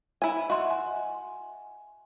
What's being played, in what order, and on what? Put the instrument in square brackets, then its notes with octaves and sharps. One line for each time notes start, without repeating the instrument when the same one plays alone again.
[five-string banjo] E4 G#5
[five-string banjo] F#4 [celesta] D#5 E5 C6
[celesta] G#5